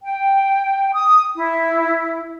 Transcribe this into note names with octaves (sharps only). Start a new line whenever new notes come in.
G5
D#6
E4